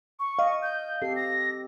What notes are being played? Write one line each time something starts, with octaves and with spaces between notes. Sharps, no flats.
C#6
D#5 F5
G6
C4 G4 A4 C7
A#6